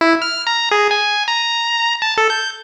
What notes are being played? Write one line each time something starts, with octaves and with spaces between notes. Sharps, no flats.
E4
F6
A#5
G#4
G#5
A#5
A5
A4
G6